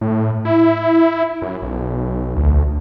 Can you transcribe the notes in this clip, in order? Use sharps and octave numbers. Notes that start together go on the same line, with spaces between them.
A2
E4
F#2
B1
D2